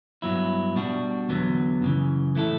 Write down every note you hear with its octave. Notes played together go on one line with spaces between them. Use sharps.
G2 F#3 B3 E4
B2 G3 D4 F#4
E2 D3 F#3 B3
F#2 C#3 E3
E3 A3 E4 A4